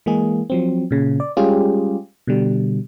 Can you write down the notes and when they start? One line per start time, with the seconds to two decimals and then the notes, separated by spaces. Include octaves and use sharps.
0.06 E3 G#3 A#3 G#4
0.50 F3 F#3 C4
0.91 A#2 C#3
1.20 D5
1.37 G3 G#3 C#4 F4 G4 G#4
2.27 B2 D3 G3